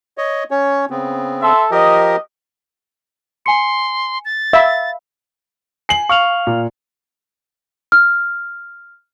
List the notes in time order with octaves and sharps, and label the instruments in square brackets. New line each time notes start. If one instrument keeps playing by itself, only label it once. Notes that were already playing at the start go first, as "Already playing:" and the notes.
[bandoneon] C#5 D#5
C#4 C#5
C#3 B3 C4
[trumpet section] A4 E5 C6
[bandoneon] F3 G4 A#4 [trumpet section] D#5
[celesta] G#5 C#7 [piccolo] C6
[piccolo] A6
[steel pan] E5 [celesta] F5 B5
[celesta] G#5 [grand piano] C7 F#7
[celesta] F5 F6 F7 [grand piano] C#6
[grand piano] A#2
[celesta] F6